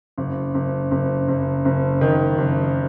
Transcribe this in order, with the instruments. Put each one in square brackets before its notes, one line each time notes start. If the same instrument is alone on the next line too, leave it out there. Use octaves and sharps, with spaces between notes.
[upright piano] F#1
F#1
F#1
F#1
F#1
D#3
F#1